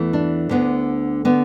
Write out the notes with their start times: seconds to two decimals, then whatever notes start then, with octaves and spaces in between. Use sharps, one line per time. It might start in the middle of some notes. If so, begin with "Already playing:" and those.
Already playing: E2 E3 A3
0.13 D4
0.49 D2 D3 B3
1.25 D3 B3